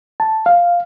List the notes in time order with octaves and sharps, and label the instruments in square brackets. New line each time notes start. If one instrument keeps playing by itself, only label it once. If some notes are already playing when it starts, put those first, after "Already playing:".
[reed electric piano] A5
F5